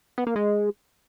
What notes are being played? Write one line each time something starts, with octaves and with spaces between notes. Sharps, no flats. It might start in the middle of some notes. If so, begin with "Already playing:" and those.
B3
A#3
G#3